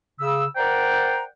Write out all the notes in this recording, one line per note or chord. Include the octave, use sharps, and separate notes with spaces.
C#3 E6
A#4 C5 D5 F#5 G5 A#5